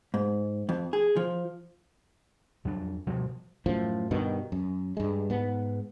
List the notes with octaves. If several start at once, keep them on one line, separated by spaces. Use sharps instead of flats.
G#2
F2
G#4
F3
F2 F#3 D4
B2 F3 G3
F#2 A2 F3
G2 B2 D#3
F#2
G2 G#3
G#2 B3